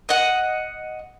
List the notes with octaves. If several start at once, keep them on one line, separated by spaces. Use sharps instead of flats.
D#5 F#5